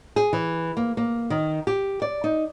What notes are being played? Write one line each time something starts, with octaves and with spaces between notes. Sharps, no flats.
G#4
E3
A#3
A#3
D#3
G4
D5
D#4